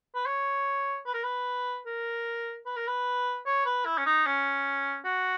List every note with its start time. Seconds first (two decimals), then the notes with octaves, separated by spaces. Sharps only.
0.15 B4
0.26 C#5
1.06 B4
1.14 A#4
1.23 B4
1.86 A#4
2.66 B4
2.76 A#4
2.87 B4
3.46 C#5
3.66 B4
3.85 E4
3.98 C#4
4.06 D#4
4.26 C#4
5.05 F#4